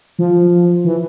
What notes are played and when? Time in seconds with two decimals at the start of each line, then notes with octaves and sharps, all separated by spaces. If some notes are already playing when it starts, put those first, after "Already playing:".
0.19 F3
0.84 E3